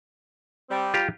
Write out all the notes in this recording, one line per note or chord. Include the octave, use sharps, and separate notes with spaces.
G3 C4
F4 G4 A#5